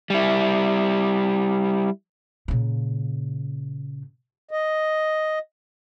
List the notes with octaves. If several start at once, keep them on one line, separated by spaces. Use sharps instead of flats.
G3 E4
A#2 C#3
D#5